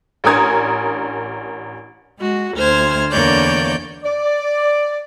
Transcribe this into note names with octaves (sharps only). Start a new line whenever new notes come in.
A1 D4 A#4 G#5 D#6 G#6
G#3 F#4
D2 C5 F6 G#6
E2 D3 A#3 C#5 D5 G6
D5